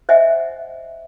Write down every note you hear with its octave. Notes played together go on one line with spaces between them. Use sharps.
C5 D#5 E5 F#5 G#5